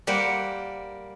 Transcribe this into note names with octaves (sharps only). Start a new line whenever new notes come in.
G3 A#3 C5 F#5